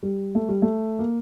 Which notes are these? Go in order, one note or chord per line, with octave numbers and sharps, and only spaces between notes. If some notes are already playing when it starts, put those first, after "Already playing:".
G3
A3
G3
A3
A#3